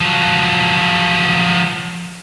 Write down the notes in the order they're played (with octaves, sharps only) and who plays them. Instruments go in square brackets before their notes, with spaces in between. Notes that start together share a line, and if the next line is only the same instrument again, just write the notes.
[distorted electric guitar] F3 F#3